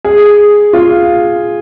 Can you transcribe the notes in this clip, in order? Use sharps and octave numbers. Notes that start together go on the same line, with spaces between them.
G#4
F4